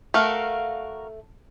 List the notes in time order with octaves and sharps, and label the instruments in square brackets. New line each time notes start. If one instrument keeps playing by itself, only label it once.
[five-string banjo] A3 [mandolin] F#4 A#4 F5